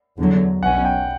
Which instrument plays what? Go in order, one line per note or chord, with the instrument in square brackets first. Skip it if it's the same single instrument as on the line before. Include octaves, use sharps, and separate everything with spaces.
[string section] E2 D3 F#3
[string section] B1 B2 F#3 C#4 [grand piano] F#5
[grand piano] G5